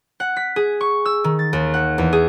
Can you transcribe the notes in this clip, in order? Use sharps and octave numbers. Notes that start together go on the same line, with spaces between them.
F#5
B6
G#4
C#6
E6
D#3
A6
D#2
F#5
E2
G#4